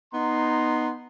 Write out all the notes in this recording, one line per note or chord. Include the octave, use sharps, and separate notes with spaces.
B3 D#4 A#5 C6